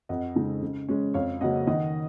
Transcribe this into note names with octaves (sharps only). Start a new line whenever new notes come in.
F2 D#5 F#5
C#3 G#3 D#4
C#3
G#3 C#4
F2 C#5 F5
C#3 F#3 A#3 C#4 D#5 F#5
D#3 D#5 F#5